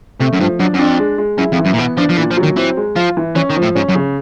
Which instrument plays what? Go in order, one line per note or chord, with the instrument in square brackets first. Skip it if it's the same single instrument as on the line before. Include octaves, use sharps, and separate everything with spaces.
[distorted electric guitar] C3 [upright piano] A3
[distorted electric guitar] F#2
[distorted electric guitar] G2 [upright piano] F3
[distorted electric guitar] F#2 [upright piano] D4
[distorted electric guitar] F#2
[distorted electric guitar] F2 [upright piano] D4
[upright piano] G#3
G#3
[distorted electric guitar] F#2 [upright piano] E4
[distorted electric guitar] F2
[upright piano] E3
[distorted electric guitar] F#2
A#2
[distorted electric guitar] B2 [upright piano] B3
[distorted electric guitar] F3 [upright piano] D4
[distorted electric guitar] F3
[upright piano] A#2 [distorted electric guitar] E3
[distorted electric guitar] F3
[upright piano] F#3
[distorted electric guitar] D#3
[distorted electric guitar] E3 [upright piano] C4
[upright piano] G#3
[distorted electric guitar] F3 [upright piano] F4
[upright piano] E3
[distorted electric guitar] E3 [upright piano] C#4
[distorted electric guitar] D#3
[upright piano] F3
[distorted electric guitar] A2
[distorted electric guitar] G#2 [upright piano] C#4
[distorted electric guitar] F#2
[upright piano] C#3